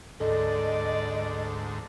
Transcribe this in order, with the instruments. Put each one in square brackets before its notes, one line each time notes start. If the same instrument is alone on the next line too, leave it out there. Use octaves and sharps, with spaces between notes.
[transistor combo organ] D2 G#2 [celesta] A4 [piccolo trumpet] D5 [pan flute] D#5